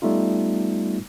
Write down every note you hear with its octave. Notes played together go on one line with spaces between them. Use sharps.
G3 A3 B3 D#4 F4